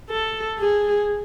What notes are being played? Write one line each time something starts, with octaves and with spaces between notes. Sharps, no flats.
A4
G#4